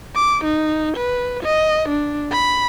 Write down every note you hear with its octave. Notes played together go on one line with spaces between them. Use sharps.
D6
D#4
B4
D#5
D4
B5